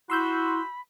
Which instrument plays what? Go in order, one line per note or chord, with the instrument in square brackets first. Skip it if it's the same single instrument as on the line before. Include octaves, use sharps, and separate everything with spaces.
[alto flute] E4 [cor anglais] F#4 [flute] B5 [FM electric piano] C6 E6 G6